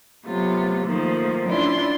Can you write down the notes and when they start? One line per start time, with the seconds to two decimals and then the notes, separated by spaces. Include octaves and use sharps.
0.24 C3 F#3 A3 B3 F4
0.85 D#3 F3 A3 A#3
1.47 C#4 D4 E4 F4 C6